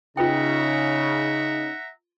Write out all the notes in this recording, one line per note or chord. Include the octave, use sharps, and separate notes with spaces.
C#3 D#4 F4 B4 E5 F#5 G5 A#5